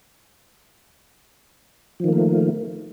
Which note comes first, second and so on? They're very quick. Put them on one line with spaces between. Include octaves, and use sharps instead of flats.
F3 D#3 A#3 A3